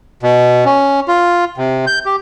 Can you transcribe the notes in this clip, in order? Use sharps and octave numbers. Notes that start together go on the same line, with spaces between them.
B2
C#4
F4
C3
G6
G4